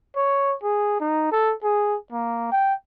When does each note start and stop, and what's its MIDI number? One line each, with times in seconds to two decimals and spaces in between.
0.16 0.55 73
0.63 0.98 68
1.00 1.31 63
1.32 1.53 69
1.63 1.96 68
2.12 2.48 58
2.52 2.74 79